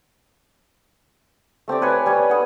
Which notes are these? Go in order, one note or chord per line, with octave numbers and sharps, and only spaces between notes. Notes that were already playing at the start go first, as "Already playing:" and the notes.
A3 C4 G4 D5
B4 C#5 G#5
G3 C#5
F#5 D#6